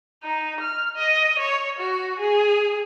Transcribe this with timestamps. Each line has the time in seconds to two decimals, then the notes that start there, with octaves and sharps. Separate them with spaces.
0.24 D#4
0.61 F6
0.96 D#5
1.39 C#5
1.79 F#4
2.20 G#4